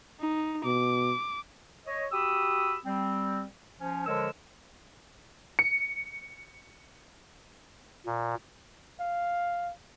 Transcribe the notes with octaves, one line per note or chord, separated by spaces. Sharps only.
D#4
B2 D6
C#5 D#5
F#4 G4 B5 D#6 E6
G3 C4
F3 C#4
D3 F3 G#3 A#4 C#5 E6
C#7
A#2
F5